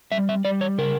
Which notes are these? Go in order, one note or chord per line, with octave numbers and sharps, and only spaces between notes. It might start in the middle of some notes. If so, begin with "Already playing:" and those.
G3 E5
E5
G3 D5
C#5
C#3 A#4